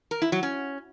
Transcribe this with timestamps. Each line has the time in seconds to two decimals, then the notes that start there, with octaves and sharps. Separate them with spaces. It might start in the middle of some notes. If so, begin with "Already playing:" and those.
0.11 A#4
0.22 E4
0.32 F#3
0.43 C#4